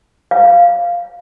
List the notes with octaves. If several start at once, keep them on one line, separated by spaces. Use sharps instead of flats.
F5